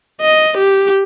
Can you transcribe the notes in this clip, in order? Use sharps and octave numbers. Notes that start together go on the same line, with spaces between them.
D#5
G4